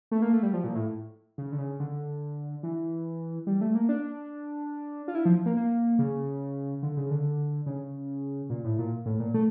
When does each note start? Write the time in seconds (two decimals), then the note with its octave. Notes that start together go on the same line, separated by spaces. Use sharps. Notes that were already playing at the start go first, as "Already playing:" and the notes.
0.11 A3
0.22 A#3
0.33 A3
0.43 G3
0.53 F3
0.64 A#2
0.75 A2
1.38 C#3
1.52 D3
1.58 C#3
1.80 D3
2.63 E3
3.47 G3
3.61 A3
3.75 A#3
3.89 D4
5.08 F4
5.15 E4
5.25 F3
5.46 A#3
5.57 A#3
5.99 C#3
6.82 D3
6.97 C#3
7.11 D3
7.66 C#3
8.50 A#2
8.64 A2
8.79 A#2
9.06 A2
9.20 A#2
9.34 A3